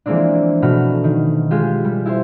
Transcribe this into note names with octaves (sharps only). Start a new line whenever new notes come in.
E3 F3 G#3 A#3 C4 D4
B2 A3 F#4 B5 F6
D#3
G#3 F4 G4
G3
E4 G4 C5